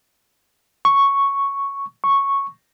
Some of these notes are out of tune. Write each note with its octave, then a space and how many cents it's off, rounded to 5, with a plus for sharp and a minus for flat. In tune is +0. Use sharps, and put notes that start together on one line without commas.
C#6 +0
C#6 -5